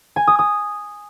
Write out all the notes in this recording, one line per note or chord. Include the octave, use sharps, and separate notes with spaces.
G#5
D#6
D#6